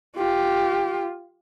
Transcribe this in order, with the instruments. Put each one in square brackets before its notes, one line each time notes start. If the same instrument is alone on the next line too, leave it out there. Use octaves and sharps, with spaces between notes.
[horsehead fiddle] F4 G4